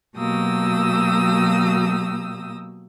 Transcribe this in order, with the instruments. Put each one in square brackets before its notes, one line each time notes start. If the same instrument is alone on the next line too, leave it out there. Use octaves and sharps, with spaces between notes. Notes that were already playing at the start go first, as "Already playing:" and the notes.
[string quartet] B2 F#3 A#3 G4 D#6 E6